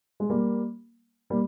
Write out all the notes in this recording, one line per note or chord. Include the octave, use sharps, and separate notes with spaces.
G#3
G3 A#3
G3 A#3